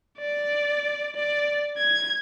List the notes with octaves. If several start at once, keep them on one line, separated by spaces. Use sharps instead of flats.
D5
D5
G#6